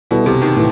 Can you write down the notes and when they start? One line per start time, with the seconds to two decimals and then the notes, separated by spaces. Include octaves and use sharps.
0.11 B2 G3 B3 E4 A4
0.26 C3
0.42 D#3
0.56 A2 E3